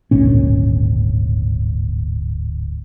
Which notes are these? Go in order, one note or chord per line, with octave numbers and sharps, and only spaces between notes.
D1 G#1 A#2 C#4